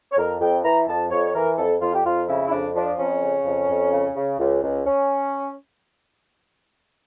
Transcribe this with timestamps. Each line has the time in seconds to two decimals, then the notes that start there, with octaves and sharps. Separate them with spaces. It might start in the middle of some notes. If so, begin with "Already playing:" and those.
0.12 C#5
0.18 F2 A#4
0.41 F2 G5
0.64 E3 A#5
0.88 F2 A5
1.11 F2 C#5
1.27 C#5
1.34 E3 A#4
1.58 F2 A4
1.81 F2 F4
1.94 G4
2.05 F2 F4
2.28 C#3 E4
2.47 E4
2.52 F2 D4
2.75 F3 D4
2.99 F2 C#4
3.22 C#3
3.45 F2
3.69 F2
3.92 C#3
4.16 C#3
4.39 C#2
4.63 C#2
4.86 C#4